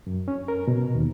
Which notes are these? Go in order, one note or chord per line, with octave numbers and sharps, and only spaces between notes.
F#2
C#4
A#4
B2
D#2